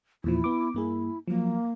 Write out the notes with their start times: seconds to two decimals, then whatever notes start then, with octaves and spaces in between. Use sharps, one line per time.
0.24 E2 A#2 F3 E4
0.44 B3 D6
0.74 G2 A#3 E4 G#4
1.28 F3 F#3 A#3